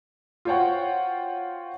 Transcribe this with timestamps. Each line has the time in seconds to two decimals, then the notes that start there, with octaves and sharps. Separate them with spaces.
0.45 F4 F#4 C5 C#5 F#5 G5